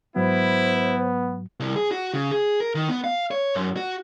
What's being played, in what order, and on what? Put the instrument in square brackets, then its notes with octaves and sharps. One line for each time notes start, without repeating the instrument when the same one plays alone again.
[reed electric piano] G#2 F#3 [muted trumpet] B3 [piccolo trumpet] E4 [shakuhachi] C5
[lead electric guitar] C2
G#4
F#4
C#3
G#4
A#4
D#3
B3
F5
C#5
F#2
F#4